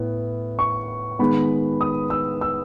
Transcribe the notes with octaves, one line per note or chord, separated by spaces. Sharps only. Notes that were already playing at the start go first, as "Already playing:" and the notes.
Already playing: A2 B3
C#6
D#3 G#3 B3 B5
D#6
E6
E6